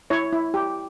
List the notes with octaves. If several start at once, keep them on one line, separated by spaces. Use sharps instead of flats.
E4 C#5
E4
G4